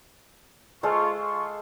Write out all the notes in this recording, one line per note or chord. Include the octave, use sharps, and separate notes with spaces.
G#3 F4 A4 C5 C#6
F4 C6 C#6